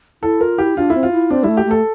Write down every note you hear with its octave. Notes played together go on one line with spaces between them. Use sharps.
E4 A4
F4 A#4
E4 G4
D4 F4
C4 E4
F4
E4
C4 D4
G3 A3 E4
G4
A3
A4